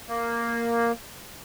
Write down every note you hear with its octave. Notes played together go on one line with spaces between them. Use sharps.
A#3